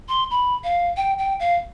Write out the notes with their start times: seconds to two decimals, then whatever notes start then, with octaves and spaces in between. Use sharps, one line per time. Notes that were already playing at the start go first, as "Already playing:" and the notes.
0.09 C6
0.31 B5
0.64 F5
0.97 G5
1.18 G5
1.40 F5